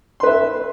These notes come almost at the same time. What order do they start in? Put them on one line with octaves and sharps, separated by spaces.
C6 B4 E5